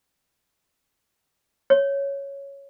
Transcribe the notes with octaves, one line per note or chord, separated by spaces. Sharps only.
C#5